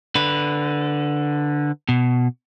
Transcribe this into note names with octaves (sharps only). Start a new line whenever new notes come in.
D3 B4
B2